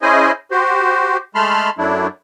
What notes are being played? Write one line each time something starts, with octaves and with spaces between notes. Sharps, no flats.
C#4 E4 G#4 C5 D#5 G#5
F#4 G4 C5
G#3 A3 A5 B5 C6 F6
F#2 F#3 A3 D4 E4